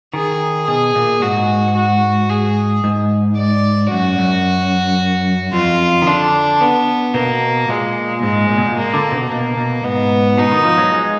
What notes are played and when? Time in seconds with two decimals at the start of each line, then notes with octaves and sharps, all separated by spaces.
0.14 D#3 G#4
0.67 B2 G#4
0.95 A#2
1.22 G#2 F#4
1.76 F#4
2.30 G#4
2.84 G#2
3.38 D5
3.91 F#2 F#4
4.19 F#2
5.53 F2 F4
6.02 D#3
6.07 D3 D4
6.61 B3
7.14 B2 A#3
7.68 A#2 G#3
8.22 G#2 G#3
8.49 A#2
8.58 B2
8.66 A#2
8.76 A#3
8.94 D3
9.12 B2
9.29 B2 A#3
9.57 B2
9.84 G#2 B3
10.38 B2 D#4
10.52 D#3
10.65 F3
10.78 F#3
10.92 G#3